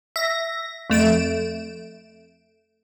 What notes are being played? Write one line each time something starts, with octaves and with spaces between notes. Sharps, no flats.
E5 A#6
F2 A3 D7 E7